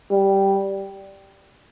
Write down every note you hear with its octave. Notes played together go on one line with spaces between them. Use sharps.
G3